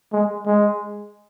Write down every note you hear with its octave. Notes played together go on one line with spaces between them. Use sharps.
G#3
G#3